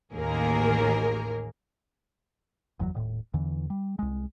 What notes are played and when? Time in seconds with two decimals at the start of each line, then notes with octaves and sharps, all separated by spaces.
0.13 A1 D#2 A#3 G#4 A#4
2.80 F#1 E2 A#2 F#3
2.94 D#1 A2
3.34 E2 D3 E3
3.70 G3
3.99 C2 G#3